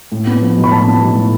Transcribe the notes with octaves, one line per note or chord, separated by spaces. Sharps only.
A2
B3
F3
B1
B5
A2 A5
B3
B1
A2